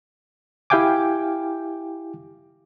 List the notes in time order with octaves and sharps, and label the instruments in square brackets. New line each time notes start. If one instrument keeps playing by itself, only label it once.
[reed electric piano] E4 G4 F5 G5 G#5 D6